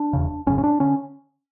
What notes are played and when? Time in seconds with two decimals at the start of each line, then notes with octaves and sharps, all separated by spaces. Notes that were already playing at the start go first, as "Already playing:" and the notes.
Already playing: D4
0.13 E1 E2 C#3
0.46 G#1 F#2 C#3 C#4
0.58 C#4
0.64 D4
0.80 D3 C#4